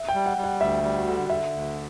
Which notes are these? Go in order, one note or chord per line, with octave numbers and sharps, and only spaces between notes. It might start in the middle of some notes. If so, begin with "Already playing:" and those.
Already playing: E5
G5
G3
F#5
G3
F#5
D2 E5
G3
F#4
D3
D3 E5
D2